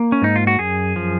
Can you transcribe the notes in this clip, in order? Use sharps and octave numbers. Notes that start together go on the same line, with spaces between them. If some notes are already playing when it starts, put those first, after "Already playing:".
Already playing: A#3
C#4
G#2 D#4
F4
F#4
F#2 G#4
F3